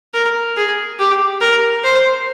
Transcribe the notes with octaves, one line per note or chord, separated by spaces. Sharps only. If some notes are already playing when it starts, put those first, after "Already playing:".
A#4
G#4
G4
A#4
C5